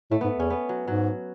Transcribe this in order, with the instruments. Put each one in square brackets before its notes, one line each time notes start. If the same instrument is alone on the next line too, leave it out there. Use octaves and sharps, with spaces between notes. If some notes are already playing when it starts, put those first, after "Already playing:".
[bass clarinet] A2 [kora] A3
[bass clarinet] G#2 [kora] B3
[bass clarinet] E2 [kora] C#4
[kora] B3
F#3
[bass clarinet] G#2 [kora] F#3